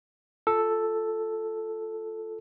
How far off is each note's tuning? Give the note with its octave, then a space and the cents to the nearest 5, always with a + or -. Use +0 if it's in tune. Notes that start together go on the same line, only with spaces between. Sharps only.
F4 +0 A4 +0